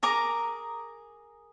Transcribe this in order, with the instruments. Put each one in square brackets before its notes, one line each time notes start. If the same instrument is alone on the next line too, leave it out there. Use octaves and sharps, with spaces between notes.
[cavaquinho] G#4 A#4 A#5 D6